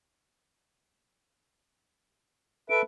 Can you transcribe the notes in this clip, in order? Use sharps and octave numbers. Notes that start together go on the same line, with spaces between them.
A4 B4 E5 D7